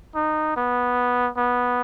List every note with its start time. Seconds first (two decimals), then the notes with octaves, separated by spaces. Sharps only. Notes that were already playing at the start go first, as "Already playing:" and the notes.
0.15 D#4
0.57 B3
1.37 B3